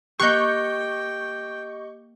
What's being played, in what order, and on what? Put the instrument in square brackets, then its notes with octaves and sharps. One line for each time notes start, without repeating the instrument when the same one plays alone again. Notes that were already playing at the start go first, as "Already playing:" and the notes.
[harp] A#3 F#6 C7 [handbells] G4 D#5 [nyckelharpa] G5 [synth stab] C#6 G6